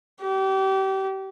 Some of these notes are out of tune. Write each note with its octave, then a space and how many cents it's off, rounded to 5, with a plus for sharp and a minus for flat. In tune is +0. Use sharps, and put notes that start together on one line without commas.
G4 -30